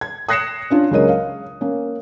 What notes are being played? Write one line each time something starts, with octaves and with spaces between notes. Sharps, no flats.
G#6
D#6 F#6 A#6 C7 C#7 E7
C#4 D4 F4
C#2 C#3 F#3 A#4 D#5 D#7
F5
A#3 C#4